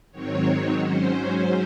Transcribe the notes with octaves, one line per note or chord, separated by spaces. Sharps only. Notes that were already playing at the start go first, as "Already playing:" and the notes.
G#2 D#3 F#3 C4 C#5
C#5
G#2 F#3 C#4 C5